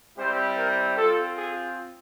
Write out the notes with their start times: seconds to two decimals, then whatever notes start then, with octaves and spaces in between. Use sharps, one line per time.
0.17 G3 C4 E4 G4 C5
0.57 A#4
0.96 C4 F4 A4
1.36 G#4